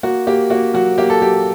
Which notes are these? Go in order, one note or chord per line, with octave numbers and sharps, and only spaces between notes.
A#3 F#4
A#3 G4
A#3 F#4
F#3 F#4
A#3 G4
A4
F#3 G4